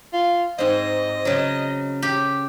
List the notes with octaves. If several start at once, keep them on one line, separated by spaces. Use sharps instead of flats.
F4
G#2 C4 D#5
C#3 F#3
G4